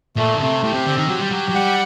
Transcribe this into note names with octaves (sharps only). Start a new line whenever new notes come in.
A#2 A3
D3
C3 A3
A2 G4
C3
D3 C4
D#3
F#3 G4
G3
F#3 G4
F#3
G3 F#5